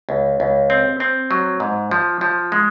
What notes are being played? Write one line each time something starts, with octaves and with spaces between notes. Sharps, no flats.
C#2
C#2
C4
C4
F#3
G#2
F3
F3
G#3